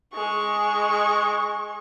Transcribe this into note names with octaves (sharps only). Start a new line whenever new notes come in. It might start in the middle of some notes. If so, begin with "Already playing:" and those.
G#3 C#6